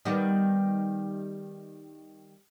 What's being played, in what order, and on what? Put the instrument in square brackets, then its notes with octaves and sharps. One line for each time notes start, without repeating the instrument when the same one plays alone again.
[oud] D#3 G3 B3